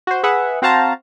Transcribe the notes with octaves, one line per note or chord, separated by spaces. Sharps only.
F#4 C5
G#4 B4 E5 F#5
C4 F#4 C5 F5 A5 A#5